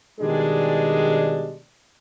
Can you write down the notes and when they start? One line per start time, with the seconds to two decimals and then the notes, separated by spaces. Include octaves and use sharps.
0.20 B2 D#3 G3 G#3 D4 G#4